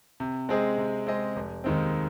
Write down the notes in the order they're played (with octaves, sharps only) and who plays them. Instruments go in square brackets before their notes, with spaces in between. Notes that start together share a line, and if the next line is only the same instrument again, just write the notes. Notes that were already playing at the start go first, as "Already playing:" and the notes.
[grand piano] C3
G#3 C4 G#4 D#5
C3
G#3 C4 G#4 D#5
F1
D#2 D#3 G#3 C4